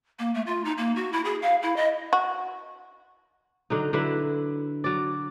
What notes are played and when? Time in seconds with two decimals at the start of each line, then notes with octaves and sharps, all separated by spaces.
0.19 A#3
0.34 A3
0.47 F4
0.65 D#4
0.77 A#3
0.96 F#4
1.13 E4
1.25 G#4
1.42 F5
1.62 E4
1.76 D#5
2.13 F#4
3.70 D3 F#3 D#4
3.93 D3 F#3 E4 B4
4.84 F#3 D5